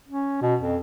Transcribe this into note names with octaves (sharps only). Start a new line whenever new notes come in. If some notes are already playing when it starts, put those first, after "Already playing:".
C#4
B2
F2